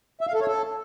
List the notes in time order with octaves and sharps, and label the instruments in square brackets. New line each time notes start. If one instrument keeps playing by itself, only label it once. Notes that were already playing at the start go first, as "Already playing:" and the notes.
[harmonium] E5
F5
A4
C#5
A4